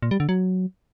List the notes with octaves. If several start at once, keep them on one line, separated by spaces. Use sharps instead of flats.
A#2
G3
D3
F#3